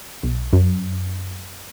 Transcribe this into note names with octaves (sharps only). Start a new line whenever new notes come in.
B1
F#2